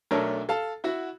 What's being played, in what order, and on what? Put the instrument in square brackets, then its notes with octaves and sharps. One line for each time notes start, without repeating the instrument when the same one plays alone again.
[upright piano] B1 A3 D4 A4 A#4 C#5
A4 F5 A5
E4 F#4 E5 F#5